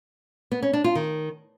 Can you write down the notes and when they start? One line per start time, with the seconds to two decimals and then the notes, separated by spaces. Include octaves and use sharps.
0.52 B3
0.63 C#4
0.73 D4
0.84 F4
0.95 D#3